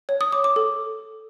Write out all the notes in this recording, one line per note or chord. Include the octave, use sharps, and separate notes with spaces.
C#5
D#6
D6
D6
A4